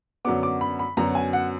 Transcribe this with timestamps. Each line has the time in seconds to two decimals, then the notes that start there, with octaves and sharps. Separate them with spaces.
0.25 F#2 D3 F#3 B3 D6
0.43 D6
0.61 B5
0.79 B5
0.97 F#2 D3 F#3 B3 A#5
1.15 G#5
1.33 F#5